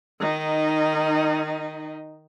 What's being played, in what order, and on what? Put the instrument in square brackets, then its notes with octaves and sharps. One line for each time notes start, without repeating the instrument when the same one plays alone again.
[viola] D#3 D#4